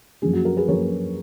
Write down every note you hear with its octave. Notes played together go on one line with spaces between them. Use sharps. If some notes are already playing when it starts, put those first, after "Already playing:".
F#2 F3 A#3 C#4 G#4
F#4
F#4 A#4
G#4 B4
F#2 F3 A#3 C#4 A#4 C#5